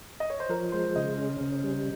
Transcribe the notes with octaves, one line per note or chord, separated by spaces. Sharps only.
D#5
C#5
C5
F3 A#4
G#3 C5
C#3 D#5
C#4
C#3
G3